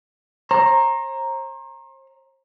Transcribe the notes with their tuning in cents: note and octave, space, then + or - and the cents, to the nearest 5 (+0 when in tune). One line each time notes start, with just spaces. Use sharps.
C5 +40 A#5 +0